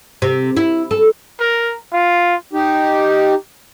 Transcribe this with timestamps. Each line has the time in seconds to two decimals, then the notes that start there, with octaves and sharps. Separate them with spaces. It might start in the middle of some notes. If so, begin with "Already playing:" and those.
0.22 C3
0.57 E4
0.91 A4
1.40 A#4
1.92 F4
2.53 D#4 G4